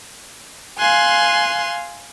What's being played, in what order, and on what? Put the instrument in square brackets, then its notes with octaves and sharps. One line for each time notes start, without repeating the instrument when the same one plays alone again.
[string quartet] F5 G#5 C6 F#6